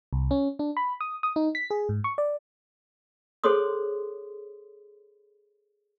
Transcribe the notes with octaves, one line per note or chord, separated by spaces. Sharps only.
C2
C#4
D4
B5
D#6
D#6
D#4
B6
G#4
G#2
C#6
D5
G#4 A4 C5 C#5 C6 D#6